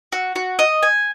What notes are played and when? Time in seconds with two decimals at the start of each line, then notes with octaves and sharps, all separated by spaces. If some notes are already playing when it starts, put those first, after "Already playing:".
0.12 F#4
0.36 F#4
0.59 D#5
0.83 G#5